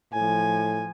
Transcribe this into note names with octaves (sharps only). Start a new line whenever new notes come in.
A2 F3 G#5